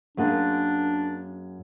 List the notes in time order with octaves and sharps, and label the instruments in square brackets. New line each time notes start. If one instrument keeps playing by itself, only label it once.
[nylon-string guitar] F#2 A#3 G#4 [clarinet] D4